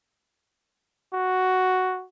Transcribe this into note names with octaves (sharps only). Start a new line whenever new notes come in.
F#4